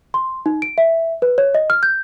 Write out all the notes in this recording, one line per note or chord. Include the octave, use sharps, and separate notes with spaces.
C6
D#4
D7
E5
B4
C#5
D#5
F6
G6